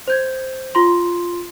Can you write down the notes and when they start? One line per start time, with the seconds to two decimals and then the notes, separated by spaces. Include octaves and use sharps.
0.08 C5 G6 G#6
0.75 F4 C6